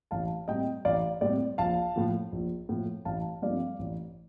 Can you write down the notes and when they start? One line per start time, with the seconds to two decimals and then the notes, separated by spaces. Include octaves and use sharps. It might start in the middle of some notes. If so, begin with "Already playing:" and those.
0.11 A1 F5 A5
0.48 A2 G3 C4 D#5 G5
0.85 A1 D5 F5
1.21 A2 G3 C4 D5
1.58 A#1 F5 A5
1.96 A2 F3
2.32 A#1
2.69 A2 F3
3.05 A1 F5 A5
3.42 G2 F3 A3 C4 D5 F5
3.79 A1